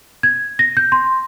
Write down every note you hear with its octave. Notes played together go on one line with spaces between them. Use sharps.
G#6
A#6
G6
C6